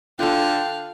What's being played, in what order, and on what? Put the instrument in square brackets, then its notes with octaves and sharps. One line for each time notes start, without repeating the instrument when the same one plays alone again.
[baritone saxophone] D3 [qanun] F4 A4 [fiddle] F5 [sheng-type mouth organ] G5 F#6